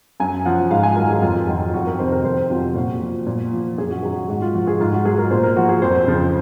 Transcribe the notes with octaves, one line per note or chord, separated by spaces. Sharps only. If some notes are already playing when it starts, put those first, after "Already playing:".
F#2 G#5
F3 F#5
G#2 F5
G#5
D#3 F#3 A#4
G#4
F2 F4
D#3 F#3
F2 F#4
A#4
C3 D#3 C5
A#4
F2 C5
C3 D#3 F#3 F4
A#2 F#4
F3
A#2
F3
F#2 G#4
F#4
D#3 F#3 G#4
F#4
G#2 F#4
F4
F3 F#4
G#4
G#2 F4
F#4
F#3 G#4
A#4
A#2 C5
A#4
F3 F#4
G#4
F2 C5
C#3 F3